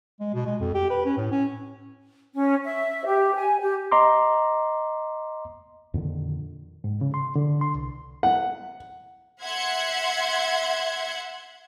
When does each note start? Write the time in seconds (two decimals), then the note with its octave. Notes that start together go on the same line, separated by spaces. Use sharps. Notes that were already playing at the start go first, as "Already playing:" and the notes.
0.20 G#3
0.34 B2
0.46 G#3
0.60 F2
0.74 G4
0.90 B4
1.06 C#4
1.17 A2
1.31 C#4
2.34 C#4
2.64 E5
3.05 G4
3.35 G#5
3.61 G4
3.91 D#5 A#5 C6 D6
5.94 F2 A#2 D3 D#3
6.84 G#2
7.01 C#3
7.14 C6
7.36 D3
7.61 C6
7.75 C2
8.23 F#5
9.43 E5 F#5 C6 G#6